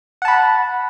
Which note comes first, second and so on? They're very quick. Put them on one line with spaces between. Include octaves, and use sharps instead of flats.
F#5 A5 B5